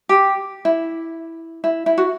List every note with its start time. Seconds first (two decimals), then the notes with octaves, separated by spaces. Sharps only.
0.09 G4
0.65 E4
1.64 E4
1.86 E4
1.98 F#4